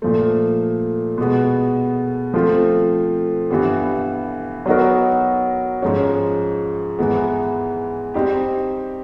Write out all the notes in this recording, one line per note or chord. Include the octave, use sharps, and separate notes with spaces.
A#2 F3 A3
B2 G#3 B3
F3 A3 C4 F4
G2 E3 G3 B3
F#3 B3 D#4 F#4 A#4
G#2 F3 G#3 C#4
G#2 E3 G#3 B3
G3 C4 D#4 G4